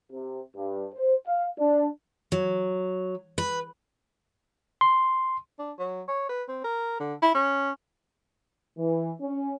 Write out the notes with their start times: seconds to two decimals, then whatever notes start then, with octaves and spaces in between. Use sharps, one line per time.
0.12 C3
0.56 G2
0.94 C5
1.26 F5
1.59 D4
2.32 F#3
3.38 B4
4.81 C6
5.59 D4
5.79 F#3
6.08 C#5
6.29 B4
6.48 C4
6.64 A#4
7.00 D3
7.22 E4
7.35 C#4
8.78 E3
9.20 C#4